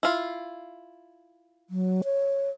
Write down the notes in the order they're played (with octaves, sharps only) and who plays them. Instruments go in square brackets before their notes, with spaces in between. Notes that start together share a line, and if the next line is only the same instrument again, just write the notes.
[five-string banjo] E4 F4
[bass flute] F#3
C#5